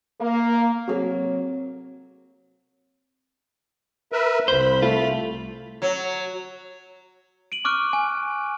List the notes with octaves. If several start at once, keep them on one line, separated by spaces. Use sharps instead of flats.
A#3
C3 F#3 A#3 C4 F#4 G#4 A4
A#4 B4 E5
C2 C5 B5
A3 F4
F#3
D7 D#7 F#7
C#6 D6 F6 F#6 D7
G#5